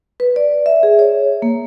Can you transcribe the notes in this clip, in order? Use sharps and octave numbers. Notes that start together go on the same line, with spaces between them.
B4
D5
E5
G#4
C#5
A#3